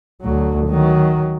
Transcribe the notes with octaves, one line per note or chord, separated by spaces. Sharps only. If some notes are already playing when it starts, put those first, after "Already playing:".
D2 F#3
D#3 F#3